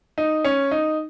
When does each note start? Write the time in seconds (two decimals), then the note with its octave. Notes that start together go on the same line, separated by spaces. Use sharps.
0.18 D#4
0.44 C#4
0.71 D#4